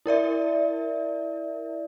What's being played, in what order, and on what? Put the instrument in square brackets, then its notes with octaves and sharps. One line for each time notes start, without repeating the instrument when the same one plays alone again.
[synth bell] E4 A#4 D5 E5